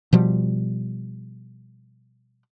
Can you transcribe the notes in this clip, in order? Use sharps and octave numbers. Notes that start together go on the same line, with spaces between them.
B2 F3 G3